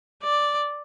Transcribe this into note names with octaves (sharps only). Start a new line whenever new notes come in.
D5